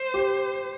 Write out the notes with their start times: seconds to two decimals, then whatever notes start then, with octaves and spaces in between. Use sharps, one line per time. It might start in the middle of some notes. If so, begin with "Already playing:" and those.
Already playing: C5
0.14 G4